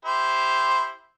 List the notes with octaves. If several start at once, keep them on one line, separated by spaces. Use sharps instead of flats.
E4 G4 C5